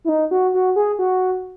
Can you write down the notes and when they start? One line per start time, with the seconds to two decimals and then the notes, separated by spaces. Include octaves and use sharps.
0.05 E4
0.09 D#4
0.31 F#4
0.54 F#4
0.76 G#4
0.99 F#4